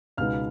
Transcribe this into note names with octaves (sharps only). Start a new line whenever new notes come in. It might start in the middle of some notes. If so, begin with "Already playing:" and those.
C#2 B2 G#3 B3 D#4 F5 F6